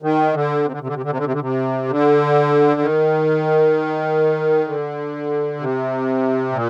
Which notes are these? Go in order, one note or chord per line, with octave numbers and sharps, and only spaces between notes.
D#3
D3
C3
D3
C3
D3
C3
D3
C3
D3
C3
D3
C3
D3
D#3
D3
C3
A#2